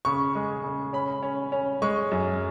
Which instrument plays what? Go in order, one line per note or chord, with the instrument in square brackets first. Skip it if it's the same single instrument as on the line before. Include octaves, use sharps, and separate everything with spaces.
[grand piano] C#3 C#6
G#3
C#3
C#4 B5
C#4
C#4
G#3 C#6
F#2